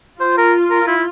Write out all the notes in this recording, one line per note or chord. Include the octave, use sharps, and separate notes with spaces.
F4 C5
A#4
A#4
E4